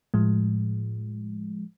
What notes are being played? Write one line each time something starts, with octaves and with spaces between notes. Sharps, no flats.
A2 F3 G#3